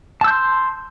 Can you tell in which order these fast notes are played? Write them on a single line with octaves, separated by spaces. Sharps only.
A5 E6 G6 C6